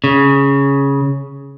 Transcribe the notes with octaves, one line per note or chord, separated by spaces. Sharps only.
C#3